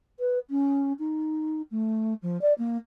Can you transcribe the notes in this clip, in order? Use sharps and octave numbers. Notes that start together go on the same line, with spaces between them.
B4
C#4
D#4
A3
F3
D5
A#3